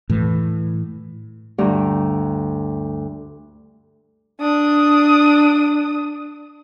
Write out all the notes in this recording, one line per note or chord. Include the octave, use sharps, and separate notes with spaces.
A2 E3
D2 G2 A#5
D4 D#6